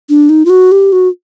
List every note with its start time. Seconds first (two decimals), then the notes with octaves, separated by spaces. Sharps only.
0.09 D4
0.29 D#4
0.45 F4
0.50 F#4
0.72 G4
0.92 F#4